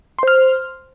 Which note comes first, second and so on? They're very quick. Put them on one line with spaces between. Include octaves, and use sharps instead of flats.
C6 C5 F6